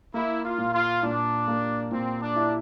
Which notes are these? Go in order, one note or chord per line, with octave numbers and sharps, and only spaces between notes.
A#3 E4
F4
A#2
F4
A#2 D4
A#3
A#2 C4
D4
E4